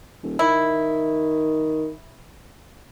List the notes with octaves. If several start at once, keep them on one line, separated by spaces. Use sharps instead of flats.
D#1
D#3 E4